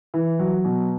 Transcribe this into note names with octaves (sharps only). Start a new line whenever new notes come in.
E3
F#3
B2